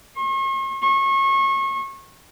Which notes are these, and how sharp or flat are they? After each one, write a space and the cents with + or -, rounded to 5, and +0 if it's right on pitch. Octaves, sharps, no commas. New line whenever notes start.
C#6 -45
C#6 -30